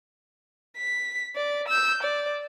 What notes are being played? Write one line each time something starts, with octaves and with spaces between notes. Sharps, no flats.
B6
D5
E6 G6
D5